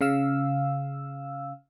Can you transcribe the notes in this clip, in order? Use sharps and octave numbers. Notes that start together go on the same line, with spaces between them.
C#3 F5 E6